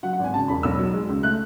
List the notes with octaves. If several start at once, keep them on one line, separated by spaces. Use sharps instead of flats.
F#3 F#5
F#5
G#1 G#5
C#3 A5
E1 B5
B1 E6
F#3
G#3
C#2
A3 F#6